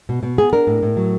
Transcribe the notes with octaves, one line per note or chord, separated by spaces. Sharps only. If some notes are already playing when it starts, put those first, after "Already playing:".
B2
B2
B3 G#4
D4 A#4
A2
A2
F#3